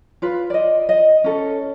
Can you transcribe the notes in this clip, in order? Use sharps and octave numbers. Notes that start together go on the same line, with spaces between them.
F4 B4
D5 D#5
D#5
C#4 A4